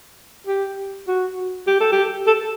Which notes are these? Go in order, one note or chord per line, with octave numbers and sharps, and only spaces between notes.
G4
F#4
G4
A4
G4
A4